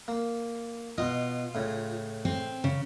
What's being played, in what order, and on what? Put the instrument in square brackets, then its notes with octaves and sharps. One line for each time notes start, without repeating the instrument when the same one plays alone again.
[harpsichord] A#3
[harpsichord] B2 D#5 [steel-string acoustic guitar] F4
[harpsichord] A2 C#3
[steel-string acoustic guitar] C4
C#3